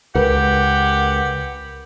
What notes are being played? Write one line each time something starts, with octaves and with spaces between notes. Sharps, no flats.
C#2 G4 A#4 B4 F#5